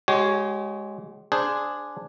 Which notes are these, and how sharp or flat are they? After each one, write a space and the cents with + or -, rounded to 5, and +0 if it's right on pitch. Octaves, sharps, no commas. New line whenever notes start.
G#3 +0 G4 -40 C#5 +0
D4 +0 G#4 +0 C5 -15